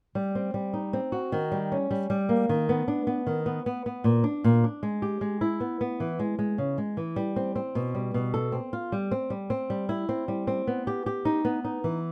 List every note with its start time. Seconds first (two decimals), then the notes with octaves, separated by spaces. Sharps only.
0.15 G3
0.35 C4
0.54 G3
0.74 D#4
0.93 C4
1.12 F#4
1.32 D#3
1.52 G3
1.72 C#4
1.91 G3
2.10 G3
2.29 A#3
2.49 D#3
2.69 B3
2.88 D4
3.07 B3
3.27 D#3
3.46 B3
3.66 B3
3.86 B3
4.04 A#2
4.24 D4
4.44 A#2
4.64 D4
4.83 G#3
5.02 G4
5.21 G#3
5.41 E4
5.60 B3
5.81 B3
6.00 E3
6.19 G#3
6.39 G#3
6.58 C#3
6.78 G#3
6.97 E3
7.16 G3
7.36 C4
7.56 C4
7.75 B2
7.95 G3
8.14 B2
8.34 A4
8.52 C4
8.73 F4
8.92 G3
9.11 C4
9.30 G3
9.50 C4
9.70 G3
9.89 E4
10.09 C4
10.28 G3
10.47 C4
10.67 B3
10.87 G4
11.06 G4
11.25 D#4
11.45 B3
11.65 D#4
11.84 E3